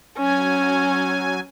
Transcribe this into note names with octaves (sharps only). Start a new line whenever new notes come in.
F#3 C#4 G#5